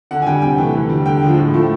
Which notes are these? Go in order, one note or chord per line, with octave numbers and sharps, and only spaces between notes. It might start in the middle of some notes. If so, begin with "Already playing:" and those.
D3 F#5
G#5
G3 G5
C3 G5
E3 A3
D3
G3
D3 G5
F3 G#3
A2
F3 A3